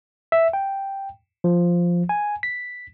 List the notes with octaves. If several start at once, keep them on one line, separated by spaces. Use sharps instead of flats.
E5
G5
F3
G#5
B6